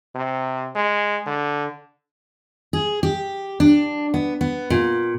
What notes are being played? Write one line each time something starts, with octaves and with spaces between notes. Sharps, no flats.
C3
G#3
D3
G#4
G4
D4
B3
B3
A#2